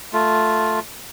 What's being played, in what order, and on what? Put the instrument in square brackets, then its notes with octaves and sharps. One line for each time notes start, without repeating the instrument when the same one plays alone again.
[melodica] A3 F4